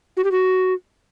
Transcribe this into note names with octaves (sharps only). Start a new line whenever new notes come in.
F#4
G4
F#4